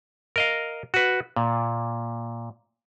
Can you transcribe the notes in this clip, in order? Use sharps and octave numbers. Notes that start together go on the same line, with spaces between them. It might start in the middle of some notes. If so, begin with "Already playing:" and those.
A#4 D#5 F5
F#4 B4
A#2